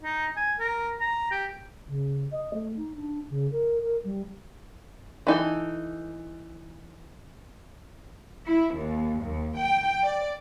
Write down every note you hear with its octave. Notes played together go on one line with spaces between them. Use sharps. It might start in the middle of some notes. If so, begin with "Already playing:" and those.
D#4
G#5
A#4
A#5
G4
C#3
D#5
A3
D#4
D4
C#3
A#4
A#4
G3
E3 D#4 A4
E4
D#2
D#2
G5
D5